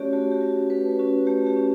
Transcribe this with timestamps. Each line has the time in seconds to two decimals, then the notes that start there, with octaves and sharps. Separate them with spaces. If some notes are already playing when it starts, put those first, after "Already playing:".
Already playing: A3 C#4 F#4 G4 C#5 D5
0.13 A3 F#4
0.31 G4
0.41 C#4 F#4
0.70 A3 B4
0.99 C#4 F#4
1.27 A3 G4
1.47 G4
1.56 C#4 F#4